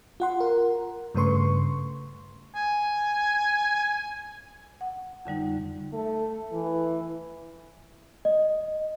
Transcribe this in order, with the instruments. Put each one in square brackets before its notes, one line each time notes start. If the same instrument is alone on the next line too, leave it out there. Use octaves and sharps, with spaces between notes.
[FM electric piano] F4 F#5 C6
A#4
G2 C#3 A3 B4 C6 C#6
[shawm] G#5
[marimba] F#5
F2 D3 G3 D#4
[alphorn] A3
E3
[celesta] D#5